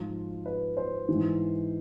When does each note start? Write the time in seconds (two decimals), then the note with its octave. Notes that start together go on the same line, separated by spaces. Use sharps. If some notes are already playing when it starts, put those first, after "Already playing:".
Already playing: G#2 F3 F4
0.46 B4
0.77 C5
1.09 G#2 E3